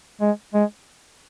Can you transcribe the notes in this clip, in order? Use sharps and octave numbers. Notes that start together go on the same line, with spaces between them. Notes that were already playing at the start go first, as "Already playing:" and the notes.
G#3
G#3